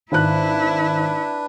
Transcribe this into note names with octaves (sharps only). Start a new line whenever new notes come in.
G#1 D4 E4 B4 F#6